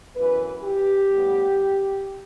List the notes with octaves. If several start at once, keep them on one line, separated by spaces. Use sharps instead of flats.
F#2 E3 B3 B4
G4
A2 G3 B3